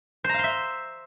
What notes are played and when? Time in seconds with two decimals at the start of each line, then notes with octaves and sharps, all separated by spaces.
0.24 C5
0.29 A#5
0.34 F5
0.39 C6
0.44 E5